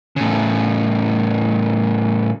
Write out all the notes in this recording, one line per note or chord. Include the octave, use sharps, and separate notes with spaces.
A2 C#3